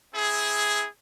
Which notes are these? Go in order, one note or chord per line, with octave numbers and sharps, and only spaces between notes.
C4 E4 G#4